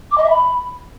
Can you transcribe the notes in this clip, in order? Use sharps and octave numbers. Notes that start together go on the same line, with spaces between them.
D6
D#5
E5
B5